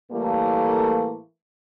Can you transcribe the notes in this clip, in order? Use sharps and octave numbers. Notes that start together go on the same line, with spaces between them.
A2 E3 G3 A3 A#3